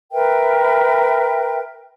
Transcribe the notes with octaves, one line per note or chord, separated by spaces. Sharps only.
A#4 B4 E5 G5